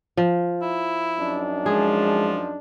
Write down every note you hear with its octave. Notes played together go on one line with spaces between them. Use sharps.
F3
E4
F#2 D4 D#4
F3 G#3 G#4